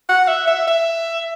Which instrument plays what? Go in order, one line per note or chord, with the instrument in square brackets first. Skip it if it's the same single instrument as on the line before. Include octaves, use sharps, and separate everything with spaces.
[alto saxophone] F#5
E5
E5
E5